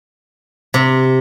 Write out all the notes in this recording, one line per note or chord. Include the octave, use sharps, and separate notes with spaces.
C3